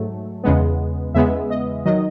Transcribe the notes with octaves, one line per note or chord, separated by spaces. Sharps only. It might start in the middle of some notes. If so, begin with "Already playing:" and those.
Already playing: G#2 F#3 A3
E2 C#3 G#3 B3
E2 C#3 G#3 B3 E5
D#5
D#3 F#3 D#5